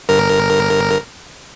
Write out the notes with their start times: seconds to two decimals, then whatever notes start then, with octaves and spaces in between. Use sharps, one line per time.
0.09 G1 A#4